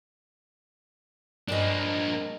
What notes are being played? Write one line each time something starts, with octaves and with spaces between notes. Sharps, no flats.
G2 A#3 D4 G#4 D#5